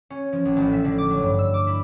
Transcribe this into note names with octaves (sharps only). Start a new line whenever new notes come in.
C#4
F3
A#1
A1
E5
D3
D6
F#3
G2
E6
D6
E4